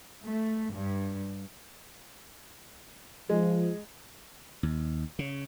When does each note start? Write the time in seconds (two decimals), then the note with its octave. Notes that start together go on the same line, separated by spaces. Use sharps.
0.23 A3
0.73 G2
3.29 F3 G#3
4.63 D#2
5.19 C#3